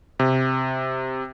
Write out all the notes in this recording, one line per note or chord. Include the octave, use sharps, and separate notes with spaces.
C3